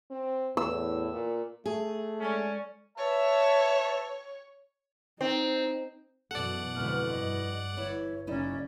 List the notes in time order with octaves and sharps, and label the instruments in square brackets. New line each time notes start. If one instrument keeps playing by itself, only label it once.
[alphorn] C4
[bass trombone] E2 [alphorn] A2 [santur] E6
[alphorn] A#2
[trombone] A3 [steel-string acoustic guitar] G#4 [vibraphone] A5
[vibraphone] G#3 A4 D5 [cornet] C#4
[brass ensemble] B4 E5 A5 [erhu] C#5
[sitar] C4 [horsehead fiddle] D#4
[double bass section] F#2 B2 E3 [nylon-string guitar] A4 [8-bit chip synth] D5 F#5
[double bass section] F2 G#2 D3 [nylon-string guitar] B2 E3 [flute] F6
[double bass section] G2 [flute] D#5
[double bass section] G1 [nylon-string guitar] E3 E4 [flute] C#5
[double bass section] F#1 C#3 C#4 [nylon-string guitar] D#4 E4 [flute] D5